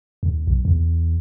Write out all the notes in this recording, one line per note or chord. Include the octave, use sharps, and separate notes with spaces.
D#2
B1
E2